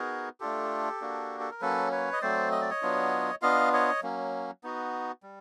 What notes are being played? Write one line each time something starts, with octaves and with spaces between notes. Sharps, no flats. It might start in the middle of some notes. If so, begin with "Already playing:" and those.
Already playing: B3 D#4 F#4 G#4 A#4
A3 D4 F4 G4 A4
A#3 D4 F#4
A4
A#4
F#3 A#3 C#4 A4 B4
B4 C#5
D#5
F#3 A3 C4 C5 D5
D#5
D5
C#5 D#5
F#3 B3 D4 F4
B3 D4 F4 D#5 F5
C#5 D#5
F#3 A#3 C#4
B3 D#4 F#4
G3